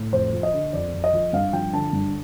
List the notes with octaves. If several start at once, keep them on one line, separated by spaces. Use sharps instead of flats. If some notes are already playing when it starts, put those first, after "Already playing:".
Already playing: A2
F2 C5
F3
D#5
D3
F2 D5
F2
D#5
F3
G2 F5
F3 G5
D3 A5
G2